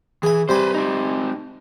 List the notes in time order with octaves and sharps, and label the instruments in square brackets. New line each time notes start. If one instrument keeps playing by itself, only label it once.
[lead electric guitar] E3 [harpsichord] G#4 G#5
[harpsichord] C3 G3 G#5 [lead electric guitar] B4 C5
[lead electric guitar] C4 D#4